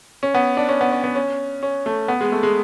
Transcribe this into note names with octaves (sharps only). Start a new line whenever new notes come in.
C#4
B3
D4
C#4
B3
C#4
B3
C#4
C#4
A3
B3
G#3
A3
G#3